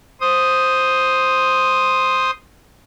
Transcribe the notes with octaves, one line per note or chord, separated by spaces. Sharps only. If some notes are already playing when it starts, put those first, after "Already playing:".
C5 D#6